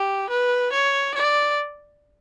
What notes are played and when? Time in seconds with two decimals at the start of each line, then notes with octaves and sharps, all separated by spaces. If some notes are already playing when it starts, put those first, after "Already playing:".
Already playing: G4
0.29 B4
0.72 C#5
1.14 D5